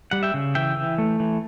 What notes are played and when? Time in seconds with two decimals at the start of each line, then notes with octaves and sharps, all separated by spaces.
0.11 G3 F#5
0.23 E5 G5
0.34 C#3
0.55 E3 E5 G5
0.76 E3
0.98 A3
1.20 E3